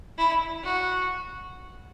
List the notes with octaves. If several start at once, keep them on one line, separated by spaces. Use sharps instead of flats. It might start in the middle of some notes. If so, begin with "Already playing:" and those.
E4
F#4